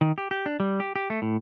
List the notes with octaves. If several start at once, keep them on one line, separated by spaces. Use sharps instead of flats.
D#3
G4
G4
D4
G3
G4
G4
A3
A2